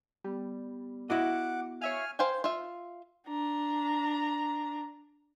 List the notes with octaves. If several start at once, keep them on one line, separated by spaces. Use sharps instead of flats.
G3 B3
E4 F#4 D#5 F#5 D6
C#5 E5 F5 G#5 F6
C5 F5 G5 G#5
F4 E5
D4 A#5